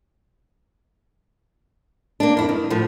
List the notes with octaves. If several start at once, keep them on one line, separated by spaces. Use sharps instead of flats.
A#3 D4
F2 E4
G2 D#3
A2 F3